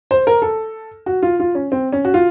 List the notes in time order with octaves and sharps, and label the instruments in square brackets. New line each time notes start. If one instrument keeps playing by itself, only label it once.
[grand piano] C5
A#4
A4
F#4
F4
F4
C#4
C4
C#4
F#4
F4